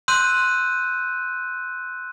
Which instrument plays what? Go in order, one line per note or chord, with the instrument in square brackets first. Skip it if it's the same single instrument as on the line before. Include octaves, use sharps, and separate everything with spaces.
[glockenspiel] C6 E6 F#6 G6 D#7